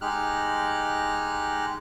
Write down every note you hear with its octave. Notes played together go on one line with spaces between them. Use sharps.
G#3 D#4 G4 F6 F#6